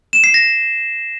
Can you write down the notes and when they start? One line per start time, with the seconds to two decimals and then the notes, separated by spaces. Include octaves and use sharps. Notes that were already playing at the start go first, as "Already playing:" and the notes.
0.13 E7
0.24 C7
0.34 A#6